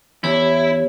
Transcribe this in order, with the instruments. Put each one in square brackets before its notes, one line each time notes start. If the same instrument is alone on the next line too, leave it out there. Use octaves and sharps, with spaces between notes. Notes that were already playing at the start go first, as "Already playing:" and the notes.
[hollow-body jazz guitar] E2 [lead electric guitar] E4 [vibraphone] G4 C#5